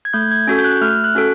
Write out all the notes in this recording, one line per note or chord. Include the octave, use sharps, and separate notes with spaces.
G#6
A3 G6
G#6
C#4 F#4 A4
G6
F#6
A3 F6
F#6
C#4 F#4 A4